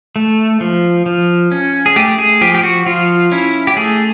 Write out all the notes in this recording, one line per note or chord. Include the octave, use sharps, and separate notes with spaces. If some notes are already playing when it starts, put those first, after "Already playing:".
A3
F3
F3
C#4
G#4
A3 G4
G#4
F3 G4
G4
F#4
F3 F4
C#4 E4
G4
A3 G#4